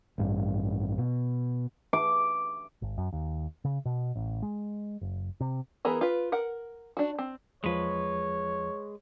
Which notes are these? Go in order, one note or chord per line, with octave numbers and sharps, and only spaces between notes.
A1 G2
B2
D6
G#1
F#2
D#2
C#3
B2
A1
G#3
F#1
C3
E3 B3 G#4 A#4
F4 B4
A#4 F#5
D4 F#4
C4
E2 F3 G#3 B4 C#5